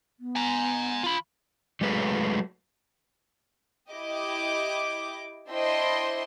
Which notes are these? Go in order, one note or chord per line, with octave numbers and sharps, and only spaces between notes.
B3
G#5 A#5
F4 B5
F#3 G#3 A3 G#4 B4
E4 G4 D#5 D6
D4 E4 C5 D#5 G5 C6